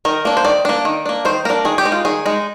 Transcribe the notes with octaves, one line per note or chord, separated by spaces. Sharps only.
D#3 A#4
A#3 D4
C5
D#3 D5
A#3 D4
D#3
A#3 D4
D#3 C5
A#3 D4 A#4
D#3 G#4
G4
G#3 D#4
F4
D#3 G#4
G#3 D#4